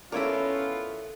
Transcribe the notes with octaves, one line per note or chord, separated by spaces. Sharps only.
B3 C#4 E4 F4 A4 A#4 C#5 D5